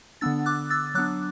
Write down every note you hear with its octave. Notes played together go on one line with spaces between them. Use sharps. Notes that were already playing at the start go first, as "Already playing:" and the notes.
D3 B3 D4 E6 A6
D6 F#6
E6 A6
F#3 B3 D4 D6 F#6